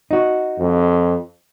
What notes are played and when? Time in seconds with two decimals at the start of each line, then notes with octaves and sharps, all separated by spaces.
0.11 D#4 F#4
0.58 F2